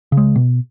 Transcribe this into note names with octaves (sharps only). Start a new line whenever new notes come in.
C#3
G#3
B2